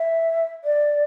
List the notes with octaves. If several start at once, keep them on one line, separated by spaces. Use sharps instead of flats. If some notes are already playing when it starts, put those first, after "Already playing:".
Already playing: E5
D5